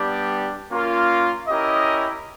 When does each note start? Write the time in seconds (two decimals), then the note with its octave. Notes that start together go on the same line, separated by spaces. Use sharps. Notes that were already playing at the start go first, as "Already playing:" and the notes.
Already playing: G3 B3 D4 G4
0.69 A#3 C#4 F4 A#4
1.47 C#4 E4 G4 A#4 D#5